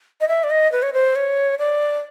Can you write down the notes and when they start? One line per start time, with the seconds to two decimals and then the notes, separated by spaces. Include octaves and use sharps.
0.21 D#5
0.28 E5
0.44 D5
0.51 D#5
0.72 B4
0.82 C#5
0.93 C5
1.16 C#5
1.59 D5